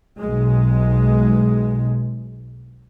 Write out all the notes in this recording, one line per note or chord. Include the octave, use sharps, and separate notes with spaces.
B1 G#3